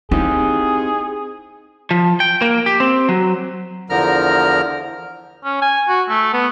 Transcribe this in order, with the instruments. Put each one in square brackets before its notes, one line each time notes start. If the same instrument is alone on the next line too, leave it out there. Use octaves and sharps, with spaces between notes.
[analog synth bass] C4 [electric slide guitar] D#4 G4 [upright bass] E4 [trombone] G#4
[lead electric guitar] F3
G5
A#3
G4
C4
F#3
[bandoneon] E2 D3 F3 A#4 A#5 F6
[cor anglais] C#4
G#5
F#4
A3
B3